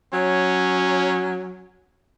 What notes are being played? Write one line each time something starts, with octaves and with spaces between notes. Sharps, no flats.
F#3 C#4